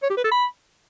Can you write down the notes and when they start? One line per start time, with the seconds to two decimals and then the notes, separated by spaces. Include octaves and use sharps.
0.03 C#5
0.10 G4
0.17 B4
0.24 A4
0.31 B5